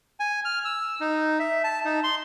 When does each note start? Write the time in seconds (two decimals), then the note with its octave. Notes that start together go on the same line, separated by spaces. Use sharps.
0.20 G#5
0.45 F6
0.65 E6
1.01 D#4
1.39 E5
1.64 A5
1.85 D#4
2.04 C6